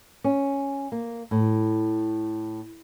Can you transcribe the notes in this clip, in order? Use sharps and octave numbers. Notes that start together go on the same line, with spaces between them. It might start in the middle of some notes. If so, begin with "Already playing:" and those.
C#4
A#3
A2